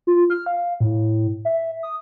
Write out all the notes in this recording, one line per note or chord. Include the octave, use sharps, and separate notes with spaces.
F4
F6
F5
A2
E5
D#6